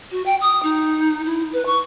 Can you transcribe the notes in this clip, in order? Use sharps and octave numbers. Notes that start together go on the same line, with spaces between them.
F#4
G5
D#6
D#4
E4
B4
C#6